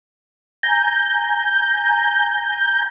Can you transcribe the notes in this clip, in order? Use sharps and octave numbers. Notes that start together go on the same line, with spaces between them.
G#5 A#5 G6